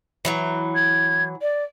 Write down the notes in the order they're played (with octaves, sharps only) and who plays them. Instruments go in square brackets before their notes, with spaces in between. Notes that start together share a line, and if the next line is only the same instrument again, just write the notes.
[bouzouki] E3 F#3 A#5
[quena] G#6
D5